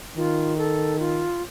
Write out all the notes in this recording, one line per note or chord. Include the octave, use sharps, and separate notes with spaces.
D#3 F4
A4
F4